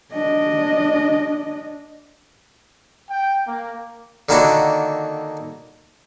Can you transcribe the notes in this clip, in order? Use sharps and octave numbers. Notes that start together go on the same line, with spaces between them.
D4 D#5
G5
A#3
D3 D#3 A#3 D4 E4 F#4